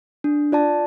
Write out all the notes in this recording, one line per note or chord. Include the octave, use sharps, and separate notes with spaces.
D4
F4 D5 A5